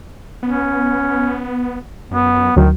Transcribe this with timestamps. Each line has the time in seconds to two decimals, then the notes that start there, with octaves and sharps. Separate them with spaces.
0.43 B3 C#4
2.11 F#2 B3
2.56 D2 D#3 F#3